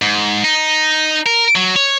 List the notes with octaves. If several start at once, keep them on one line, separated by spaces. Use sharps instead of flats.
G#2
D#4
A#4
F#3
C#5